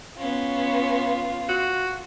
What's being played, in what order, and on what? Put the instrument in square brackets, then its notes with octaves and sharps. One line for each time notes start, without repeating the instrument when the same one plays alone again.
[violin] B3 C#4 [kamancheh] F4
[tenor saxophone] F#4